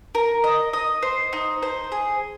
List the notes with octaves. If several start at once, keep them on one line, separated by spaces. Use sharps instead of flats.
A#4
D#5
D#5
C5
D#4
C5
G#4